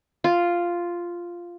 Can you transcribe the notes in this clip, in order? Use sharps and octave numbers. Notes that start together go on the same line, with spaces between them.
F4